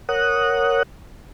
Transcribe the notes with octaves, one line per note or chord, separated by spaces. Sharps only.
A#4 C#5 F#5 D#6 F#6